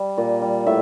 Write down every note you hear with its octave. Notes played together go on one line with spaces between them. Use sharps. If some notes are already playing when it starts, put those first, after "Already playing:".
Already playing: G3
A#2
G3
A2 E5